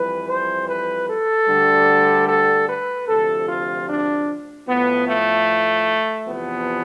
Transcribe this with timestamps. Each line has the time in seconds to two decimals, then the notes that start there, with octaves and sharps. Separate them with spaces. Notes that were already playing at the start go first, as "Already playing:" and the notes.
Already playing: F2 E3 G3 B4
0.29 C5
0.69 B4
1.09 A4
1.48 D2 D3 G3
2.29 A4
2.69 B4
3.08 D2 C3 F3 A4
3.48 F4
3.88 D4
4.68 A2 F3 B3
5.08 A3
6.27 E2 C3 F3 B3